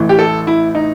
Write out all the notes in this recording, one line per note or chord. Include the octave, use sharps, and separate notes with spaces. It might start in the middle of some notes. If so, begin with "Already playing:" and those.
Already playing: A1 A2 E3
G4
A4
E4
D#4